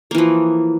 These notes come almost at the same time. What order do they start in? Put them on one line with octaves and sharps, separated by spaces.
A#3 E3 F3